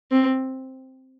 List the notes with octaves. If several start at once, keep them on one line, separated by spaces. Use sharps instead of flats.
C4